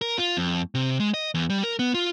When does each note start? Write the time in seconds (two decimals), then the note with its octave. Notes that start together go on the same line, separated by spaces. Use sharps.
0.01 A#4
0.18 F4
0.37 F2
0.75 C3
1.00 G#3
1.14 D#5
1.34 E2
1.50 G3
1.63 A#4
1.79 B3
1.94 F4